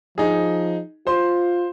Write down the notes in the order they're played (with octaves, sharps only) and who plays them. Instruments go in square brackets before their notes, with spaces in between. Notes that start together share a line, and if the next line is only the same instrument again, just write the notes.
[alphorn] F3 [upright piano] D#4 G#4
[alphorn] F4 [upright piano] C5 C6